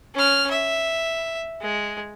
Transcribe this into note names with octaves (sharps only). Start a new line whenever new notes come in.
C#4 F6
E5
G#3